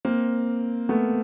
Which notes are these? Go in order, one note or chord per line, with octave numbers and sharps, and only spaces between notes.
A#3 C4
A3 B3